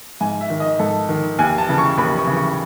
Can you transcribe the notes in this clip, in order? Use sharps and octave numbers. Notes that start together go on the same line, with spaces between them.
G#2 G#5
E5
D#3
D#5
G#2 A4
D#3
D#2 G#5
A5
C#3 E3
C#6
D#2 B5
C#6
C#3 E3
C#6